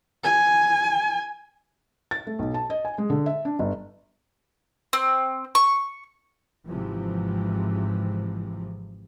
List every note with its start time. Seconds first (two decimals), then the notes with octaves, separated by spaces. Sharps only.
0.24 G#5
2.11 A6
2.27 A3
2.39 B1
2.54 A5
2.70 D#5
2.85 G#5
2.98 G#3
3.10 D3
3.26 E5
3.45 D4
3.59 G1
4.93 C4
5.55 C#6
6.67 G#1 G#2 C3 E3 F3